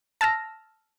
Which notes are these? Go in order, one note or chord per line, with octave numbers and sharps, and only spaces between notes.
A5 E6 F6 A#6